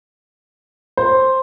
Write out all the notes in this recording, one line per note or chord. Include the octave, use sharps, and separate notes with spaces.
C5